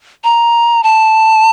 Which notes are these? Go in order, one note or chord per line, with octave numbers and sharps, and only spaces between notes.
A#5
A5